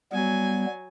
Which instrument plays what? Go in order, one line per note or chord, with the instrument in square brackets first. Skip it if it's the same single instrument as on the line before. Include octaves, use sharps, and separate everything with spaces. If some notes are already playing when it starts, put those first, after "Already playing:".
[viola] F#3 G#5 [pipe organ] G3 B3